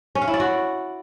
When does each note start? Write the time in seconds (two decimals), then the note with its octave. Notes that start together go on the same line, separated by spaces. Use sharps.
0.15 C#4
0.21 F5
0.28 E4
0.34 D5
0.40 F#4